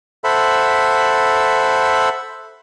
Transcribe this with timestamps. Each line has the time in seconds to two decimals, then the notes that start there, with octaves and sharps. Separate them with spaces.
0.24 A4 C5 E5 F#5 B5